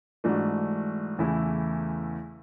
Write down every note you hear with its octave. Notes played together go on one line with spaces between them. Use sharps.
G#2 E3 A3 D4 F#4
E2 C#3 E3 A3 E4